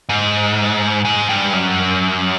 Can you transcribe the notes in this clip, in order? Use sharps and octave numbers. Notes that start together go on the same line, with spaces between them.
G#2
G#2
G2
F#2